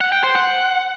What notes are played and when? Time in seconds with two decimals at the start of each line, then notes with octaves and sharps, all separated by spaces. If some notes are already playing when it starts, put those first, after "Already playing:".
0.01 F#5
0.12 G5
0.24 C5
0.35 F#5